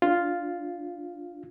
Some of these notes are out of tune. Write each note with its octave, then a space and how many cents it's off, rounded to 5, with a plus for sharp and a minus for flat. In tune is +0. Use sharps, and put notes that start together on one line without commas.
D4 +0 F4 +0